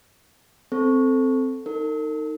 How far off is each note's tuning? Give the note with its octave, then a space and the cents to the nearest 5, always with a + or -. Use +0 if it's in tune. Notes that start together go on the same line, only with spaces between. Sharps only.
C4 -5 A4 +0
D#4 +0 A#4 -45